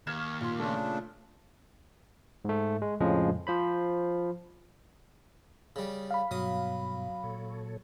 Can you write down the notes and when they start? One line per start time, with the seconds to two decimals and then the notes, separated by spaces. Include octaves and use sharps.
0.07 D#2 F6 G#6 E7
0.41 A#2 C6
0.60 C#3 A3 D4
2.45 G#2 A3
2.82 G#3
3.01 F2 A2 C#3 F3 G#3
3.47 F3 C5 B5
5.76 C#3 G3
6.11 F5 B5
6.31 G2 B2 F#3 D#6
7.23 A#2 A4 C#5